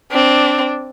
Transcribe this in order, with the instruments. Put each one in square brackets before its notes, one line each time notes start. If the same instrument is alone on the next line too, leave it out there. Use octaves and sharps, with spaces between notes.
[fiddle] C4 [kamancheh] D4